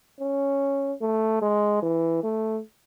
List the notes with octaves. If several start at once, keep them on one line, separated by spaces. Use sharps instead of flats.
C#4
A3
G#3
E3
A3